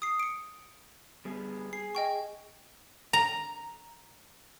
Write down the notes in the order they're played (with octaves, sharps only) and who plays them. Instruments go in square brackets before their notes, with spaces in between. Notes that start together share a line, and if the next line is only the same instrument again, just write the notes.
[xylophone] D#6 C7
C#7 D7
[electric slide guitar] G3 B3 G#4
[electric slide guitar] G#4 [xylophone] C7
[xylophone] D#5 G5 C#6
[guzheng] A#5